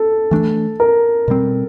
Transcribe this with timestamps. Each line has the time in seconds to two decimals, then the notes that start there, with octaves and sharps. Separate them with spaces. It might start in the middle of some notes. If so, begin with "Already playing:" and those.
Already playing: A4
0.31 E3 A3 D4
0.80 A#4
1.28 B2 G3 C4